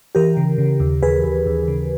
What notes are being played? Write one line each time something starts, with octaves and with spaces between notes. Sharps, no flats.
E3 G4 A#4
C#3
C#3
D#2
D#2 G#4 B4
D#2
D#2
C#3